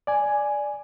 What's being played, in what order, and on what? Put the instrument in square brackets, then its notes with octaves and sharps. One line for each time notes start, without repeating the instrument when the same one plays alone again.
[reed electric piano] D5 G#5